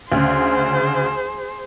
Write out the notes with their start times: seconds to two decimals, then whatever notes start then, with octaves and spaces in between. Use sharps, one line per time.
0.12 D2 C#3 G#4 C5